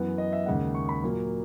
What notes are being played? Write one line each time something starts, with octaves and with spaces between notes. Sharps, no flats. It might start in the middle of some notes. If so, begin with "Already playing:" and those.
Already playing: F#2 E3 B3
D#5
E5
D#2 C#3 G#3 F#5
C#6
B5
A#2 F#3 A#3